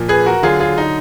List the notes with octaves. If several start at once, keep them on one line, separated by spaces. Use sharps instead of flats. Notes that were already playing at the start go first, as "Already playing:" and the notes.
Already playing: A#2 F3
G#4 B4
F#4 A#4
D3 F#3 F4 G#4
F4 G#4
D#4